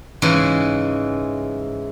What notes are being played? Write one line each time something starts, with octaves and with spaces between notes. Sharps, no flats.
G#2 C#3 E3 G#3